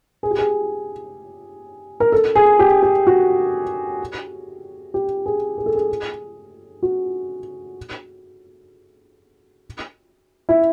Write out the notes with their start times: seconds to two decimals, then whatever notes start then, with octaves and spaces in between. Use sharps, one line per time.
0.23 G#4
0.31 G4
0.38 G#4
2.00 A#4
2.12 A4
2.36 G#4
2.59 G4
2.83 G4
3.07 F#4
4.94 G4
5.26 G#4
5.58 G#4
5.66 A4
5.75 G#4
6.83 F#4
10.49 E4